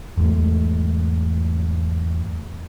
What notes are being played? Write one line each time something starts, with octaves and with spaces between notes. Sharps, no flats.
E2 G#2 A3